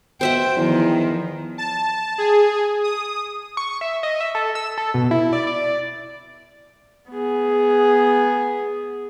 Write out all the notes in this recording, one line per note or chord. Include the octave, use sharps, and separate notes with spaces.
B2 C5 E5 F#5 G5
E2 D#3 F3
A5
G#4
D#6
C#6
E5
D#5
E5
A4
E6
A4
B2
E4
D5
D5
B3 G#4